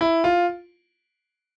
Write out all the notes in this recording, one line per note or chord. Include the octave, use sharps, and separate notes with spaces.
E4
F4